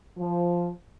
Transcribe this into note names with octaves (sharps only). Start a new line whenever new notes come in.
F3